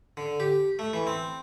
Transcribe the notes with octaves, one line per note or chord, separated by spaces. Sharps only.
D3
G4
A3
E3
C4